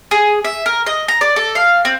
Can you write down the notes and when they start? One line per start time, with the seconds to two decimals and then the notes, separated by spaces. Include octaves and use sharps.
0.11 G#4
0.45 E5
0.66 A#4
0.86 D#5
1.08 A#5
1.21 D5
1.36 A4
1.55 F5
1.85 C4